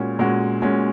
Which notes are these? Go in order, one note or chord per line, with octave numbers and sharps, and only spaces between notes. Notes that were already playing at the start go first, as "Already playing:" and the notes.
Already playing: A#2 G#3 C#4 F#4
A#2 G#3 C#4 F#4
A#2 G#3 C#4 F#4